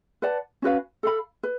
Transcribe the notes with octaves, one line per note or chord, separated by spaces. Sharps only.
B4 D5 F#5 A5
C#4 F#4 B4 F5
A4 F5 B5
B4